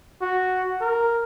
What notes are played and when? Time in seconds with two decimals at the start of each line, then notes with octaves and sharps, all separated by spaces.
0.22 F#4
0.81 A#4